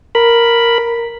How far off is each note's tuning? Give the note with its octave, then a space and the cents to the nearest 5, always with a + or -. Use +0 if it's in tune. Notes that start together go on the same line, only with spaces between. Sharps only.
A#4 +0 B5 +0